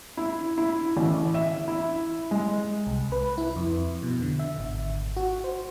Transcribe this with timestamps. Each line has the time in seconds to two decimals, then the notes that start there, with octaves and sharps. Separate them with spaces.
0.17 E4
0.58 E4
0.97 A1
1.34 E5
1.68 E4
2.31 G#3
2.87 C2
3.12 B4
3.38 E4
3.56 F2
4.03 B2
4.22 D3
4.39 E5
4.58 G#1
5.16 F#4
5.44 C5